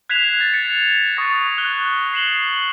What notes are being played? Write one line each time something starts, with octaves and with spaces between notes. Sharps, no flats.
F#6 G#6 B6 C7 E7 F7
A6
C#7
C#6 D#6 F#6 A6 A#6
F#6 G7
C7 E7 F#7 G7